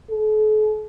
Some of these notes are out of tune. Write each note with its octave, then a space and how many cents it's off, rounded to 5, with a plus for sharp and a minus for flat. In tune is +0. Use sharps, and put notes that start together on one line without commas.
A4 -45